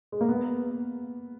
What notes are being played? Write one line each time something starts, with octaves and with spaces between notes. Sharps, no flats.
G#3
A#3
B3